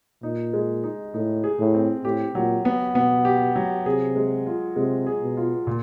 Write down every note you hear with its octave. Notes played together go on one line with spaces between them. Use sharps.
A#2 D#4
G#3
D#4
A2 D#4
G#4
A2
C4
A2 G4
A#2 F#3
B3
B2 B3
G4
F#3
C3 G#4
G#3
F4
C3 G#3
G#4
B2
F4
A#2